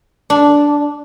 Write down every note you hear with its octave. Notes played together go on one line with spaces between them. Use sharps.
D4